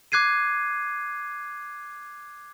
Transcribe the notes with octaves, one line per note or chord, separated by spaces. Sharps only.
D6 F#6 G#6 C7 D#7